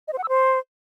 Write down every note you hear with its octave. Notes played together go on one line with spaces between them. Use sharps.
D#5
C5
F#5
E6
C5